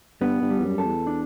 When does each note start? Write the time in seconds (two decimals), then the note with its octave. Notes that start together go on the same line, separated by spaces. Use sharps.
0.21 G2 B3
0.42 G2
0.50 G3
0.59 E2
0.64 F#2
0.77 F#2 A4
0.85 E2
1.07 D4